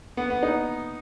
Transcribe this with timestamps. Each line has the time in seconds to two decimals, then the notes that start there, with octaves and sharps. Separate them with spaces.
0.17 B3
0.30 B3
0.43 D#4